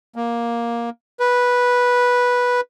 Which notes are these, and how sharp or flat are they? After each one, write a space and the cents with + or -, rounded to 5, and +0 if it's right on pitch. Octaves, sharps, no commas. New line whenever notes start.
A#3 +10
B4 -10